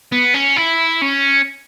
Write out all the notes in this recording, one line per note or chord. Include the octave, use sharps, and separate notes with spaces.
B3
C#4
E4
C#4